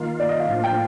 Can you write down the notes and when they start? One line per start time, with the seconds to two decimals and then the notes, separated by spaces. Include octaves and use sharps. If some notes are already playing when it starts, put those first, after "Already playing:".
Already playing: D#3 A#3 F4
0.20 D5
0.29 D#5
0.40 F5
0.49 A2 F3 A#3 D4 F4
0.64 G5